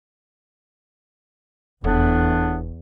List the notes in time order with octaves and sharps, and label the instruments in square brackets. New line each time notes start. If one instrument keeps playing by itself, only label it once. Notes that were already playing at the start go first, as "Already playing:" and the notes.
[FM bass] F1 [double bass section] E2 [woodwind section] A2 B3 D4